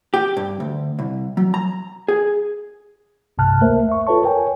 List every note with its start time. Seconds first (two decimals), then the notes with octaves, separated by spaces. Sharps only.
0.14 G4
0.37 G2
0.60 D2
0.99 C2
1.37 F#3
1.54 A#5
2.08 G#4
3.38 B1 G2 C3 A5 F6 F#6
3.61 D2 A3 A#3 A#4 C5 E5
3.89 E5 C#6
4.07 F4 A4 B4 C#5 A5 C#6
4.22 A#4 C#5 G5 G#5